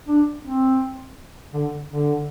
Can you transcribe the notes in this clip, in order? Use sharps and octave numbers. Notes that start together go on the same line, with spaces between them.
D4
C4
D3
D3